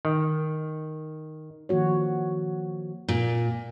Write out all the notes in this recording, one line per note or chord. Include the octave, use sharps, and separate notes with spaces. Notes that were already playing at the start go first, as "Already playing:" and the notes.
D#3
D#3 F3 A#3 F#4 C#5
A#2